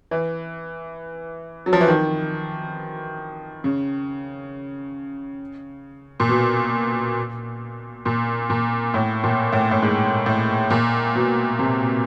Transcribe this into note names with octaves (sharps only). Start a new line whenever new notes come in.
E3
F#3
F3
E3
D#3
C#3
A#2
B2
A#2
A#2
A2
A#2
A2
A2
G#2
A2
A#2
B2
C3